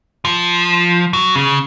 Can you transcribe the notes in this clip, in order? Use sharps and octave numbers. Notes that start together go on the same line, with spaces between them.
F3
F#3
C#3